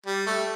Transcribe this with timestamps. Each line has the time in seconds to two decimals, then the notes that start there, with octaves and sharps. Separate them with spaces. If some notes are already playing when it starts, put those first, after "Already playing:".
0.06 G3
0.26 A3